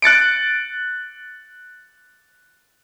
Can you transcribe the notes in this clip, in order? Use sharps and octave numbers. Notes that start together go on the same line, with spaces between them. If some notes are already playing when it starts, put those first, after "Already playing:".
F#6 A6 C#7 D7